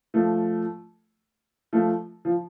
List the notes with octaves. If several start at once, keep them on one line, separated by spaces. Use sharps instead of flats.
F3 A3
F3 A3
F3